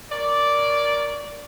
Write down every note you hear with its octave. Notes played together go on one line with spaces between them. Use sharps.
A#4 C#5 D5